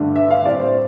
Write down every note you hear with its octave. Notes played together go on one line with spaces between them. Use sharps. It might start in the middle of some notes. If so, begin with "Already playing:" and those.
Already playing: G2 D3 A3 D4
E5
F5
A2 G3 C4 D5
C5